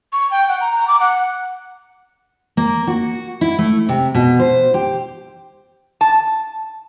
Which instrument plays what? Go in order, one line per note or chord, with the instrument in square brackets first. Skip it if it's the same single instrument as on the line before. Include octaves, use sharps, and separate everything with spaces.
[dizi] C#6
G5
F#5
A#5
A#5
D6
F#5
[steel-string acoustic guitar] A#3
F#4
E4
A3
C3
B2
C5
G4
[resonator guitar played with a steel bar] A5